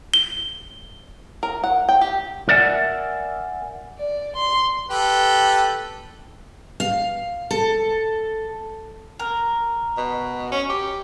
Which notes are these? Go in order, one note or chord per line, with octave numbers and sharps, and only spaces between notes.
G7
A#4
F#5
G5
G4
A#4 D5 E5 F#5 G#5
D5
C6
G4 A4 B4
F5
A4
A#4
B2
C#4
G4